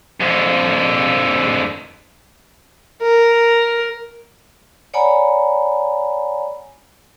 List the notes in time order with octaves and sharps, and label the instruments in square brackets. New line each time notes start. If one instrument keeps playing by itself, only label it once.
[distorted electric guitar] F2 D3
[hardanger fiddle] A#4
[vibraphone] C#5 D5 F#5 G#5 A#5 B5